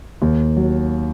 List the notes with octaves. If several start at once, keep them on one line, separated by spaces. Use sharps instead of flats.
D#2
F#3